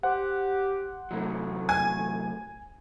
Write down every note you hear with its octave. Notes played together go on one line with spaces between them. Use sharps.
G4 C5 F#5
A2 C3 F#3 A3
G#5